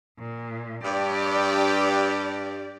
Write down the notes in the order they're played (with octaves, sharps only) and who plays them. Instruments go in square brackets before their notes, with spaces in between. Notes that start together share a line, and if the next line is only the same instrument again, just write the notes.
[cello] A#2
[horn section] G2 G4 [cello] D5